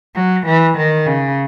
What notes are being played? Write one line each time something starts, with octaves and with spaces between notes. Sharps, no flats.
F#3
E3
D#3
C#3